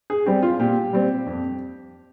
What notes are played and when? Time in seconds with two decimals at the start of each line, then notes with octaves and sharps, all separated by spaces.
0.10 G#4
0.26 G3 C4 G4
0.43 F4
0.60 A#2 G4
0.93 G3 C4
1.26 F2